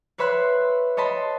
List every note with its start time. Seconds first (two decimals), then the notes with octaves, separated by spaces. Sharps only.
0.18 B4 C#5 E5 B5 C6 F#6
0.97 C#5 D#5 A5 B5 C6